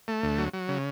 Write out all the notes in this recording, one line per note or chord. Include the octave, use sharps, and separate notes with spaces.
A3
D2
F#3
F#3
C#3